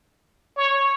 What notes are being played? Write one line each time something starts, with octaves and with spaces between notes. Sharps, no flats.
C#5